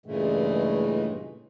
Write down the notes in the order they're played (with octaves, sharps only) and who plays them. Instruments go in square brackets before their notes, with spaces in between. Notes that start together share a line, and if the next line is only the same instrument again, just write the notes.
[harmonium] G2 A#2 C#3 E3 G#3 A3